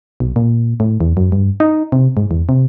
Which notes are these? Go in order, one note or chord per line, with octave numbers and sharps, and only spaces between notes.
B1
A#2
A2
E2
F#2
G2
D#4
C3
G#2
E2
C3